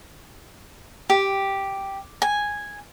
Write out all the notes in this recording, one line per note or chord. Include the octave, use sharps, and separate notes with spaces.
G4
G#5